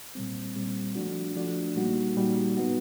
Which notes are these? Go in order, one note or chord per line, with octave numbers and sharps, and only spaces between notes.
A#2 G3 C4
A#2 G3 C4
F3 A3 D4 F#4
F3 A3 D4 F#4
A#2 G3 A#3 D#4 F#4
A#2 G3 A#3 D#4 F#4
A2 F#3 B3 D#4 F#4